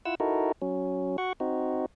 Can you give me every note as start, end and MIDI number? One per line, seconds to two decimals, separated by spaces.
0.05 0.15 64
0.05 0.15 65
0.05 0.15 78
0.05 0.15 88
0.20 0.52 63
0.20 0.52 64
0.20 0.52 66
0.20 0.52 69
0.20 0.52 70
0.62 1.17 54
0.62 1.17 61
1.18 1.33 66
1.18 1.33 78
1.18 1.33 85
1.40 1.86 60
1.40 1.86 63
1.40 1.86 66